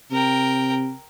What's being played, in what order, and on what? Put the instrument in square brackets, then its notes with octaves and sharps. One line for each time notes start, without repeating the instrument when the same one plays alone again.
[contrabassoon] C3 [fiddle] A#4 G5